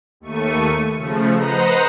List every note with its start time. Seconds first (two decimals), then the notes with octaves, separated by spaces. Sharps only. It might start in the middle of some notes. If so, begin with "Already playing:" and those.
0.20 D#2 A3 C#6 D#7
0.96 C#3 F3 A3
1.33 B4 C5 D#5 F#5 A#5